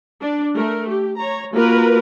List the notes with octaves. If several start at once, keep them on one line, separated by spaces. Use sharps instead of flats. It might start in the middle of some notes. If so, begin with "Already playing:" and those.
D4
A3 A#4
G4
C#5 A#5
A#3 F4 F#4 A#4 B4